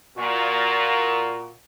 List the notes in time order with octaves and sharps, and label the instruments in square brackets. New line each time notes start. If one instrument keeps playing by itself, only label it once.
[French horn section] A#2 [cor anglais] F#4 [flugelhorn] A#4